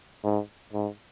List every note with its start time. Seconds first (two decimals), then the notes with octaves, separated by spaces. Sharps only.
0.24 G#2
0.73 G#2